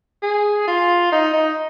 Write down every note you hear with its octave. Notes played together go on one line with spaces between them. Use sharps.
G#4
F4
D#4
D#4